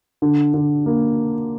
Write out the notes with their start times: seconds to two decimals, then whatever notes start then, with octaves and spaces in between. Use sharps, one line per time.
0.22 D3
0.54 D3
0.86 A#3